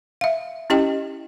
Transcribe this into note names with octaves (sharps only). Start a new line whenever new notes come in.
E5 F5
C#4 E4 G4 D#5 G5